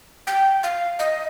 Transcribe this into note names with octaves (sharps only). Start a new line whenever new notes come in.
G5
F5
D#5